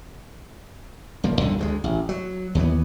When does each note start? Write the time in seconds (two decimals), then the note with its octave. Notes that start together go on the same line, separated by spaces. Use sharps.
1.24 F1 F3 A#3
1.41 B1 G2 A#2 D3
1.59 D2 F3 G#3
1.84 A1
2.09 F#3
2.55 D#2 E3 G3 B3